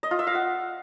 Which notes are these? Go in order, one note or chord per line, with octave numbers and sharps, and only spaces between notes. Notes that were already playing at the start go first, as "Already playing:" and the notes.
D#5
F4
E5
F5
F#5